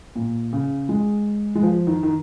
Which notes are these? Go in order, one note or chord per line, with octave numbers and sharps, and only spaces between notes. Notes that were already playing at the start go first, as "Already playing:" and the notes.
A#2
C#3
G#3
G#3
F3
D#3
D#3